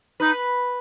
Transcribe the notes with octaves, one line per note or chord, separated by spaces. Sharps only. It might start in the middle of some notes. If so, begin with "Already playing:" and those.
D#4 B4